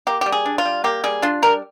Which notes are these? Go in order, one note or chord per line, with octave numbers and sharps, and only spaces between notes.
A#3 G4
G3 G4
G#4
D4
F4
G3
A#3 G4
G3 G#4
D4 F4
G3 A#4